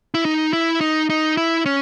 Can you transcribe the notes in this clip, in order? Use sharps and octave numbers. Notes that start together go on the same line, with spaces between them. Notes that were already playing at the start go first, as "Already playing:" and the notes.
E4
D#4
E4
D#4
D#4
E4
C#4